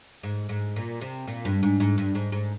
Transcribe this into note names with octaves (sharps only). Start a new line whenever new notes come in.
G#2
G#2
A#2
C3
A#2
G2
G#2
G#2
G2
G#2
G#2